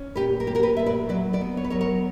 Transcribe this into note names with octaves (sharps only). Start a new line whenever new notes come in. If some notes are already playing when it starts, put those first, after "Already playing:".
Already playing: C#4
A#2 G4 B4
A#4
A#3 G4
F#4 A#4
G4 B4
A#2 E5
B4 D5
F#3 B4 D5
B4 D5
B3
C#5
B4
F#3 A#4 C#5
A#4 C#5